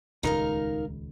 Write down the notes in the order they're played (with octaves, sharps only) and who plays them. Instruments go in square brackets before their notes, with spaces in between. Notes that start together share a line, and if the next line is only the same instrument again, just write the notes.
[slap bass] D#1 C#2 G#3 [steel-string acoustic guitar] D#4 A#4 F5